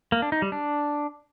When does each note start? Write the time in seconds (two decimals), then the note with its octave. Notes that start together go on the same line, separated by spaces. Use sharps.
0.12 A#3
0.22 D4
0.32 D#4
0.42 G3
0.52 D4